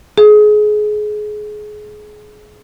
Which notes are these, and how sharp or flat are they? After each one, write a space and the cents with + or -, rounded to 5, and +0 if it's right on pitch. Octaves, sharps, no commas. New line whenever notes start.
G#4 +25